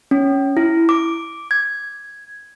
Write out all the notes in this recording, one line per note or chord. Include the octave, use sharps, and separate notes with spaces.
C#4
E4
D6
G#6